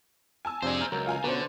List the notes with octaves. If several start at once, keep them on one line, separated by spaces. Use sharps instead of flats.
G#5 A5 E6
F2 C3 D4 G#4 C5
A#5 F6 G6
C#2 F#3 A#4
F4 G#5 A#5
B2 D3 B3 C#4 B4 C5